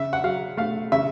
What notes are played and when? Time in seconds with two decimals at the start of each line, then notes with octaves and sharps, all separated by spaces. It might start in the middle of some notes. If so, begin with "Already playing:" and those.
Already playing: C#3 E5
0.13 F#5
0.24 F#3 F5
0.57 A3 F5
0.92 C#3 E5